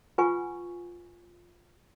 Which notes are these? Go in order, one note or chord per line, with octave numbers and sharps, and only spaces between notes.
F4 B4 F#5 G#5 C#6